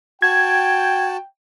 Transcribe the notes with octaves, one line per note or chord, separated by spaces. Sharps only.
F#4 G5 A5 G#6